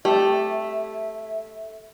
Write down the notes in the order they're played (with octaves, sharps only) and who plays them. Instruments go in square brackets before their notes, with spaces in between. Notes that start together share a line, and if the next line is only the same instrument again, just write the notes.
[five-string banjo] A3 [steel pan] G4 [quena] E5